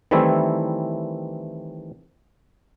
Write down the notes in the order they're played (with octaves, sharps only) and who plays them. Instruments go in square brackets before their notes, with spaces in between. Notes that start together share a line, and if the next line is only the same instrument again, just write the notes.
[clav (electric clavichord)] D#3 E3 G3 A3 C4 E4